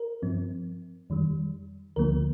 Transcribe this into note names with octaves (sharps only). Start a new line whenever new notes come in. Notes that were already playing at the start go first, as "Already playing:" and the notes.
Already playing: A#4
G2 F3 C4
F2 D#3 G3
D2 D3 F3 A#3 A#4